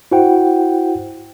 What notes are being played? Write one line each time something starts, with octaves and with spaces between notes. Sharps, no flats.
E4 F#4 C5 F#5 G5